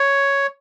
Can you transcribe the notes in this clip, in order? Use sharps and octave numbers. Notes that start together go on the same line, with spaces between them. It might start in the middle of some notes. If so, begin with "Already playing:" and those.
Already playing: C#5